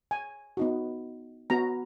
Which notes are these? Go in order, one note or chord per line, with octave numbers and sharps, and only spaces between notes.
G#5
B3 D#4 F#4
B3 F#4 A#5